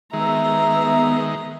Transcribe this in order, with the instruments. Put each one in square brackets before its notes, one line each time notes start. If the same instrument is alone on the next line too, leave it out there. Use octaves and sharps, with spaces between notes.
[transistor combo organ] D#3 G#3 [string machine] B3 [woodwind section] E5 [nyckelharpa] A#5